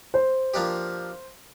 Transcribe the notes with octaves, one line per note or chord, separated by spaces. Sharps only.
C5
F3 A#3 D4 G4